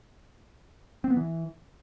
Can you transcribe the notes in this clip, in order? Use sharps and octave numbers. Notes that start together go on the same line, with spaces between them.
C4
B3
E3